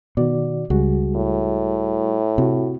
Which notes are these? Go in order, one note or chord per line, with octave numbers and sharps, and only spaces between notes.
B2 D#3 F#4 D5
C#2 G3 F#4 G#4
A2
C3 E4 F#4